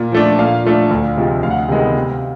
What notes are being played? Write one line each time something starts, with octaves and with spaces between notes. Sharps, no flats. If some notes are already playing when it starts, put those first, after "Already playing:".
Already playing: A#2
F3 A3 D4
A#2 F5
F3 A3 D4
D2
C3 F3 G#3
D2 F5
F#5
F5
C3 D#3 G#3 B3
C3